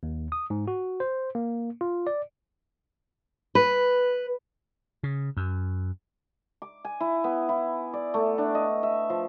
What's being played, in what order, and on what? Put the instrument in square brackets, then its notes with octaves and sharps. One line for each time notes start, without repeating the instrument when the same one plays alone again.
[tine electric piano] D#2
D#6
G#2
F#4
C5
A#3
F4
D5
[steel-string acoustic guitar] B4
[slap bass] C#3
F#2
[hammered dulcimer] D6
G#5
E4
B3
E4
D5
A3
D4
D#5
E5
F3